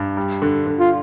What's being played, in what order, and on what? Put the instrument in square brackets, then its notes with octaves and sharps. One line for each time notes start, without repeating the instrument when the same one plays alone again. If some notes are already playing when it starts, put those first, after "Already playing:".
Already playing: [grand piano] G2
G3
D3
D3
[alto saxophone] F4